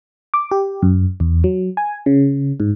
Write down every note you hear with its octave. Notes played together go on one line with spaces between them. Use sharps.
D6
G4
F#2
E2
F#3
G#5
C#3
G#2